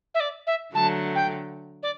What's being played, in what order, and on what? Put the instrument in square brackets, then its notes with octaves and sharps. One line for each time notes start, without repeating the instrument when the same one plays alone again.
[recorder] E5
D5
E5
[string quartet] D3 F#3 A3 [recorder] A5
[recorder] G5
D5